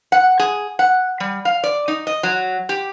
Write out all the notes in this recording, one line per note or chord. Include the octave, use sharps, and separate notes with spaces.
F#5
G#4
F#5
G3
F5
D5
D#4
D#5
F#3
G4